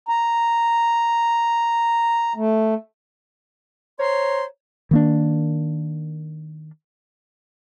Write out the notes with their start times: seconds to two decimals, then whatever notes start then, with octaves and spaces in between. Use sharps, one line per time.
0.09 A#5
2.36 A3
4.00 C5 C#5 A#5 C6
4.91 D#3 A#3 D4